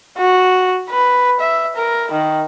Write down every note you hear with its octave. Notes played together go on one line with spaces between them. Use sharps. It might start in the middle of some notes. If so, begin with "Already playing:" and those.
F#4
B4
E5
A#4
D#3